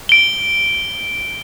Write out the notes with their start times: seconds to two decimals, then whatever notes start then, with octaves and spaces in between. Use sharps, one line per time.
0.09 D7 G7